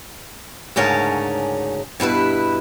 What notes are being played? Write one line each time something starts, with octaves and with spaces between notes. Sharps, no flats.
D2 G#2 C#3 C#4 A#4 A5
G2 B2 E4 B4